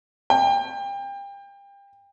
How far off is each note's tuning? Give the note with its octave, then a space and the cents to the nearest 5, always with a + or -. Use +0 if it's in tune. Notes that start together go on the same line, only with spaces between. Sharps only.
G5 +30